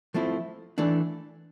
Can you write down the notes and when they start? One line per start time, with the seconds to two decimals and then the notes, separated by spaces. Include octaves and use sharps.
0.14 F3 A3 C4 E4
0.78 E3 A3 D4